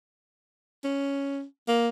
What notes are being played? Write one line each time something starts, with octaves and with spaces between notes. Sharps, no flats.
C#4
A#3